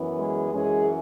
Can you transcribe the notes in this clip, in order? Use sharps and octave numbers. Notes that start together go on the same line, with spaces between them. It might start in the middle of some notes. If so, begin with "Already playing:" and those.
Already playing: F#2 E3 B3
G#3 G#4
F#2 E3 G#3 C#4 G#4